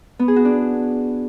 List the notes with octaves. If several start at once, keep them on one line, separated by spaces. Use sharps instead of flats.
B3
G#4
F#4
D4